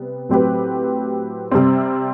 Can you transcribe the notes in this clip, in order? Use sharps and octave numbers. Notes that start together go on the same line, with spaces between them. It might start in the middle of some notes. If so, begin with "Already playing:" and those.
Already playing: C3 G3 B3
A2 F#3 C4 G4 B4
C3 G3 C4